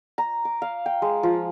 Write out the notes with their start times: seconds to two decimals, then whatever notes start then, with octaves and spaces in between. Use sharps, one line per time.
0.18 A#5
0.45 D6
0.62 F5
0.86 G5
1.02 G#3
1.23 F3